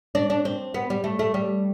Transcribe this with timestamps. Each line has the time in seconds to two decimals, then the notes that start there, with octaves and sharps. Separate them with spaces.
0.15 D4
0.30 D4
0.45 C4
0.74 B3
0.90 G3
1.04 A3
1.19 A3
1.34 G3